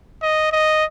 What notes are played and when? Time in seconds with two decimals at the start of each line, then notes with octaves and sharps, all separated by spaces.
0.22 D#5
0.52 D#5